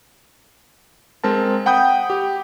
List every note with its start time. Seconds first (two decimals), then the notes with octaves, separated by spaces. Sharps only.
1.24 G#3 C4 A#4 A5
1.66 F#5 G5 B5 D#6 G6
2.10 G4